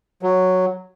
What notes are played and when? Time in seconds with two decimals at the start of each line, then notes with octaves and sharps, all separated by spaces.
0.23 F#3